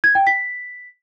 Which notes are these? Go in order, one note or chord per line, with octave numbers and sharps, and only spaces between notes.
G#6
G5
B6